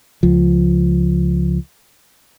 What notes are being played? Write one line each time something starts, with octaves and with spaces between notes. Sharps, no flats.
C#2 F3